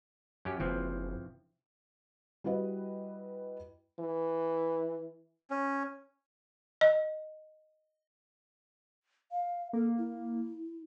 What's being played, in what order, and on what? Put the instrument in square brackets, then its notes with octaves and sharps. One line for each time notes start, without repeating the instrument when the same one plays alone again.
[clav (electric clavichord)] F#2 C#4 G4
[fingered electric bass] F#1 [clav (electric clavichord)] E3 F3 C4
[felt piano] G3 E4 F#4 B4 D#5
[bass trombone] E3
[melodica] C#4
[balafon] D#5
[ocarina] F5
[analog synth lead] A#3 [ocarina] A4
[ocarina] E4